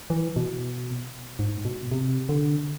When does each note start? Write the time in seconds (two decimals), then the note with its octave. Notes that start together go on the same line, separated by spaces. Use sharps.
0.10 E3
0.36 B2
1.39 G#2
1.65 B2
1.91 C3
2.29 D3